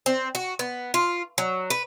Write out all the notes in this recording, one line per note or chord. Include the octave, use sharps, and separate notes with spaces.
C4
F#4
B3
F4
F#3
B4